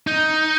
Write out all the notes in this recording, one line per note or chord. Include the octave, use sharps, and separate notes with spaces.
D#4